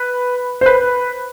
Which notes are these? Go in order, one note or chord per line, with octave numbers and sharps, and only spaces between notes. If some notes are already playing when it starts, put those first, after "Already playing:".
Already playing: B4
C5
B4